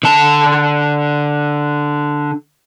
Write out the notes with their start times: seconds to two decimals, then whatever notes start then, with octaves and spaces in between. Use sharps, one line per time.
0.03 D3 A5